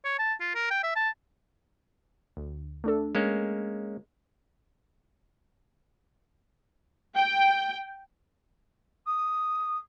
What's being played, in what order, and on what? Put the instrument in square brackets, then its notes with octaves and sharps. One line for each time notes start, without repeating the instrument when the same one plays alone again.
[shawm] C#5
A5
F4
A#4
G5
E5
A5
[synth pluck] D2
A3 D4 A4
[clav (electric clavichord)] G#3 A#3 C#4
[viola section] G5
[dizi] D#6